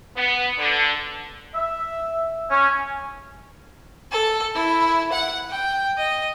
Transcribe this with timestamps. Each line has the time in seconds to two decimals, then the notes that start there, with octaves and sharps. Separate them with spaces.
0.16 B3
0.58 D3
1.54 E5
2.50 C#4
4.11 A4
4.55 E4
5.12 F#5
5.50 G5
5.98 D#5